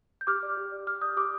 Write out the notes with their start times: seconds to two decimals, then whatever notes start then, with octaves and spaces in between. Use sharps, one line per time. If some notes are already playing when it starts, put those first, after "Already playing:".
0.21 G6
0.27 G4 D6 F6
0.43 D5
0.57 G4
0.72 D5
0.87 G4 D6 F6
1.01 D5 D#6 G6
1.17 G4 D6 F6